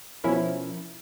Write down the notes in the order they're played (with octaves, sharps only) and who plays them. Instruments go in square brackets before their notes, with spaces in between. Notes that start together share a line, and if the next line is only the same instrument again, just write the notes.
[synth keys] B2 F3 C#4 E4 A#4